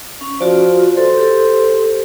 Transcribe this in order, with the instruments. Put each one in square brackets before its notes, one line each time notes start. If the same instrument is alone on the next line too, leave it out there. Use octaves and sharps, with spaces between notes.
[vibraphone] C#4
[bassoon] F3 [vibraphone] F4 F#4 D5
[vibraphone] A4 [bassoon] C5
[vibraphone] G4 A4